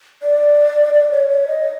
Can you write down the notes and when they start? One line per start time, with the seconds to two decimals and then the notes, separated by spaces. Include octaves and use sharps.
0.23 D5
0.94 D5
1.11 C#5
1.29 C#5
1.48 D#5